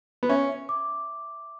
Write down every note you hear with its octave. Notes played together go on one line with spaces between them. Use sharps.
B3
C#4 E5
E5
D6